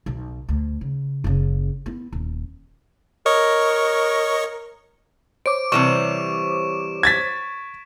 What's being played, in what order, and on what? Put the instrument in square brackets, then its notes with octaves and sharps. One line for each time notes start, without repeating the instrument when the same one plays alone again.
[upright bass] B1
D2
C#3
F#1 C#3
B3 E4
D#1
[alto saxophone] A#4 [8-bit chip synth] C#5 D#5 C#6
[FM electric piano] C5 C#5 D6 [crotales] D7
[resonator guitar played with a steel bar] C3 E3 G3 [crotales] C#6 E7
[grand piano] G#6 A6 B6